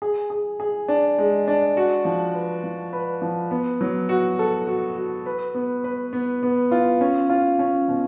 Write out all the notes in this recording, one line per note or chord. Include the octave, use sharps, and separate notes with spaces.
G#4
G#4
G#4
D4
G#3
D4
F#4
F3
B4
F3
B4
F3
B3
F#3
F#4
A4
F#4
F#4
B4
B3
B4
B3
B3
F4
C#4
F4
C#4
B2